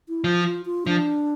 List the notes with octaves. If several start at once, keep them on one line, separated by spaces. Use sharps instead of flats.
E4
F3 F4
F4
F4
F3 D4